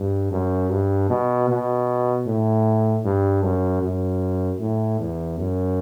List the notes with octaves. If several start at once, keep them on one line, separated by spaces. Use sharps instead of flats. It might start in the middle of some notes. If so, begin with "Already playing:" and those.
Already playing: G2
F#2
G2
B2
B2
A2
G2
F#2
F#2
A2
E2
F#2